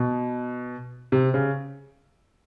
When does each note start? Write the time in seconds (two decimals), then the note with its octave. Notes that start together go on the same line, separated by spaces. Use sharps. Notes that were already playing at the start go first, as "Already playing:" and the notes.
Already playing: B2
1.12 C3
1.34 C#3